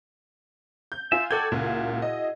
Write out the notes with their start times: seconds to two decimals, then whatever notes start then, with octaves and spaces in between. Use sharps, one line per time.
0.92 G6
1.12 F4 E5 G#5
1.31 F#4 A4 D5 G5 G#6
1.52 C#2 A#2 E4 F#4 G#4
2.02 D#5